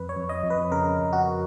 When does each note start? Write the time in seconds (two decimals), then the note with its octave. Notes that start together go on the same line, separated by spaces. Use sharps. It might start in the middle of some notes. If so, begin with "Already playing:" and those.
Already playing: F2 B4
0.09 C#5
0.16 F2
0.29 D#5
0.43 F2
0.50 B4
0.72 C#3 A#4
0.99 F2
1.13 F#4